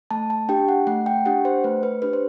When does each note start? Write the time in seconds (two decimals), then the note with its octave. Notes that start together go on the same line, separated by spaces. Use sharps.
0.11 A3 A5
0.30 A5
0.49 D4 G4 G5
0.68 F#5
0.87 A3 F#5
1.06 G5
1.25 D4 G4 F#5
1.45 C5
1.64 A3 B4
1.83 B4
2.02 D4 G4 B4
2.13 C5